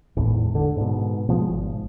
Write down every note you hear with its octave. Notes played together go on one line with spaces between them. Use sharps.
G#1 E2 A2
D3
G#2 B2
B2 F3 G#3
G#1